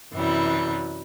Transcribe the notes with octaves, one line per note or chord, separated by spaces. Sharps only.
F#2 C3 E3 F#3 G3